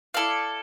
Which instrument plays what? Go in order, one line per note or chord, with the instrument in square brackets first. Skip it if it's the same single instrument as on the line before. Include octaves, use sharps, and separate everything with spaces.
[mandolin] E4 A4 D5 F5